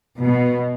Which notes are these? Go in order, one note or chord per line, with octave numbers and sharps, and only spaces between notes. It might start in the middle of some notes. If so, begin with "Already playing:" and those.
B2